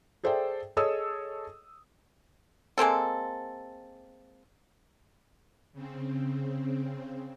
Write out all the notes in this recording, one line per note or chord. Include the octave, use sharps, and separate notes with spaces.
G#4 A4 C5 D5 E5 G5
G#4 A4 C#5 D#5 D#6 E6
G#3 A#3 C4 A4
C#3 C4